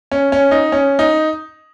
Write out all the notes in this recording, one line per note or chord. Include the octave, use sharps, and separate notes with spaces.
C#4
C#4
D#4
C#4
D#4